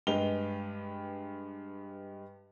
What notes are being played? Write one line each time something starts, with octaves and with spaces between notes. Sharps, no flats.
G2 G#3 G4 B4 F7 G7